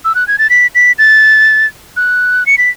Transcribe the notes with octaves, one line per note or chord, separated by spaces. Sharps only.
E6
F#6
G#6
A6
B6
B6
A6
F#6
C#7
B6